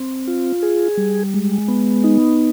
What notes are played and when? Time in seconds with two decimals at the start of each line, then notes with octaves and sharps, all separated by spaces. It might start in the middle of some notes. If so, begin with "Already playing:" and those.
Already playing: C4
0.28 F4
0.62 G#4
0.98 G3
1.34 G#3
1.68 B3
2.04 D#4